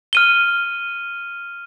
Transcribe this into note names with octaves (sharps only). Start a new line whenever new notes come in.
F6 D#7 G7